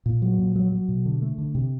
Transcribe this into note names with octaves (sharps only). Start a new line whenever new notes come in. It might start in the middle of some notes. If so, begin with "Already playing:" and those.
A#2
F#3
A#2
F#3
F#3
B2
D3
A3
D3
C3